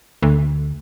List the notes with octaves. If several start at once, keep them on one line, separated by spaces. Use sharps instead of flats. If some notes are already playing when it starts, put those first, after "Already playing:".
D2